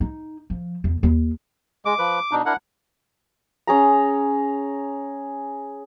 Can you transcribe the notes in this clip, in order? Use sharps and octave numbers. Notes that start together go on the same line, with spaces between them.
D#4
F3
E2
D#2
G#3 D6
F3 B4
B2 D4 D#4
D4 E4 A#4 F#5
C#4 G#4 A#5